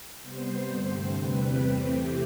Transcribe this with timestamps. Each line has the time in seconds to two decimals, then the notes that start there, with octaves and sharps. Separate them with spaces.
0.21 C3 G3 B3 C5
0.68 G2 D3 A3 C4
1.15 E2 C3 G3 C4 B4
1.64 C3 E3 A3 C4 G4